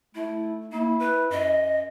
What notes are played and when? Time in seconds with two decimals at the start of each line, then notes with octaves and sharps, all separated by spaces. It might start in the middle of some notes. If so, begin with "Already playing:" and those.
0.15 A3 E4
0.72 A#3 E4
1.00 B4
1.31 F#2 D#5